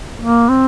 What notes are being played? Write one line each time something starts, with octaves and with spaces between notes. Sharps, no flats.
A#3
C4